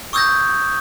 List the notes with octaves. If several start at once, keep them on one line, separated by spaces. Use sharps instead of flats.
C#6 D#6 E6 G6 G#6 A#6